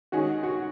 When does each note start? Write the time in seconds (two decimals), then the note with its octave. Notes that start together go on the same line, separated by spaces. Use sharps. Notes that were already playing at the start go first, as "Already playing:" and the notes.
0.12 D#3 G#3 C#4 F#4 G#4
0.43 F#4